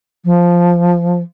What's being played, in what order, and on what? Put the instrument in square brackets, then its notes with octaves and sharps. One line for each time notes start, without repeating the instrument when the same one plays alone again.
[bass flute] F3